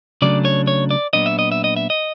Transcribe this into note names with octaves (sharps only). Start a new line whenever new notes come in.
C#3 F#3 A3 D4 D5
C#5
C#5
D5
A#2 F#3 B3 D4 D#5
E5
D#5
E5
D#5
E5
D#5